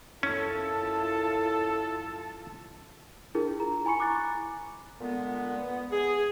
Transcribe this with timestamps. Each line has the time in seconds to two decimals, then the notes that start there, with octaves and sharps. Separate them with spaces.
0.23 F#2 C#4 E4 F4 A4 A5
3.35 D4 E4 F4 G#4 A#4
3.60 A#5
3.85 E4 G#5 B5 C#6 C#7
3.98 G#5 A#5 D6 F#6 A6
5.01 A#2 D3 G#3 B3
5.57 B3
5.91 G#4